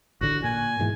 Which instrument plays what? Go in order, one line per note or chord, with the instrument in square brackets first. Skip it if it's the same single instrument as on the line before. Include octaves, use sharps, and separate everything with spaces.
[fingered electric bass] A1 D3 [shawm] F#4
[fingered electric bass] A#2 [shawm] G#5
[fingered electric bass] G#2 B2 E3